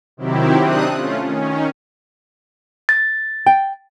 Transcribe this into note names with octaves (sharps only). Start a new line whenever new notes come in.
C3 D#3 F#3 C4 E4 G4
C3 C4 D4 D#4 D#6 F#6
A3 C#4 F4
D#3 C#4
A6
G5